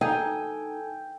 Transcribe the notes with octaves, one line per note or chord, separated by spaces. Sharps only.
D#4 A4 G5 G#5